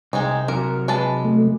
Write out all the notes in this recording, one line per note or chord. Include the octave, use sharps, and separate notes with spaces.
C2 G#3 C4 D#4
C3 F#3 A#4
G#3 B4 A5
A3